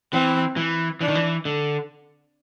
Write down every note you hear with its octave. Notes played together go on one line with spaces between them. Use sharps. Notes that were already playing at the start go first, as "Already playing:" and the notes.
E3 C4
E3
E3 D4
D#3
E3
D3